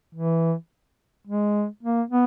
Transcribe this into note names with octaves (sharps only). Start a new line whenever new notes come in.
E3
G#3
A#3
B3